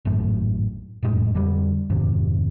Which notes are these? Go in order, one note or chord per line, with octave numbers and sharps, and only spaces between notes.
G#1 F#2 A2
F1 F#2 A2 G#3
F2 D3 G3
F1 D#2 G#2 C3